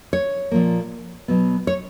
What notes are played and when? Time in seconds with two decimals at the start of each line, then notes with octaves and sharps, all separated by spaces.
0.13 C#5
0.51 A#2 F3 A#3
1.28 B2 F#3 B3
1.67 C#5